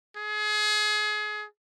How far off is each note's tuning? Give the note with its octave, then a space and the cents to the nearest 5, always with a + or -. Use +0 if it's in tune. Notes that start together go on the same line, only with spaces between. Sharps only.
G#4 +30